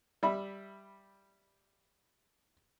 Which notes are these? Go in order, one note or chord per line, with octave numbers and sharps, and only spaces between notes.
G3 E5 B5